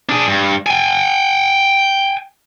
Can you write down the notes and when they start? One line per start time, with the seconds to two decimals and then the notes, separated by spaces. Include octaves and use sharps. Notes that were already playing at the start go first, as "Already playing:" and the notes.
0.09 D4 G#4
0.28 G2
0.66 G5 G#5